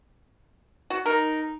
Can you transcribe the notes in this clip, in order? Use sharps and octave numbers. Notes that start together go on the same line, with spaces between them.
F#4
D#4 A#4